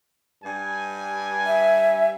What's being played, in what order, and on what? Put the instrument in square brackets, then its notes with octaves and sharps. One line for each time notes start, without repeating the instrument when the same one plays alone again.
[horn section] G2 G#5
[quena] E5